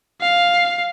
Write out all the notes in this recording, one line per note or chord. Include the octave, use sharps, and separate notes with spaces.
F5